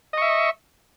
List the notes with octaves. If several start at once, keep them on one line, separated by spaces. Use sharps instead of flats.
D#5 E5 C#6